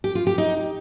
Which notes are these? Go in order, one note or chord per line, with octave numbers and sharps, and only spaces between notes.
G4
F4
G4
D#4